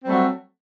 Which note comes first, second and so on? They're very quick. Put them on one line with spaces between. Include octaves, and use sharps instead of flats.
C4 G3 A3 F#3